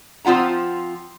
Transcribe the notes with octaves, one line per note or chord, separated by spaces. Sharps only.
F3 C4 F4 F#5 A#5